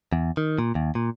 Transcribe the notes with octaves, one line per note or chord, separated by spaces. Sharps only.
E2
D#3
A#2
D#2
A#2